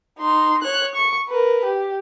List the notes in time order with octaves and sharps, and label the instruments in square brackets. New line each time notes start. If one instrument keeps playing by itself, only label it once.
[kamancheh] D#4 C6
C#5 F#6
C#6
A#4 B4
G4